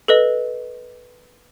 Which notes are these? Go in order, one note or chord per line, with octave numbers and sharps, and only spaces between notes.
A4 B4 D#5